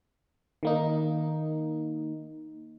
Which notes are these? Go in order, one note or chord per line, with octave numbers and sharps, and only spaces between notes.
D#3 A#3 D#4